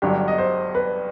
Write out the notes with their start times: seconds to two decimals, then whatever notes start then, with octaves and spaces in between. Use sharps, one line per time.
0.02 G1 G2 F#3 G4
0.28 D#5
0.38 C5
0.75 B4